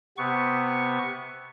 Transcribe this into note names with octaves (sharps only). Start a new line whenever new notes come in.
C3 B3 C#6